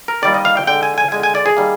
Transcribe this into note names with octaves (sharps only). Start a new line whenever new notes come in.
A#4
D#3 G3 A#3 D5
D#5
F5
G5
D3 G#3 G5
G#5
G#5
D3 G#3 G#5
G#5
D5
G#4
D#3 G3 A#3